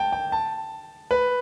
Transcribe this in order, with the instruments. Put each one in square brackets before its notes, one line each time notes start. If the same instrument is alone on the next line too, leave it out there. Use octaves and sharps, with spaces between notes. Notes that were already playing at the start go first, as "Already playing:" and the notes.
Already playing: [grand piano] G5 A5
G5
A5
B4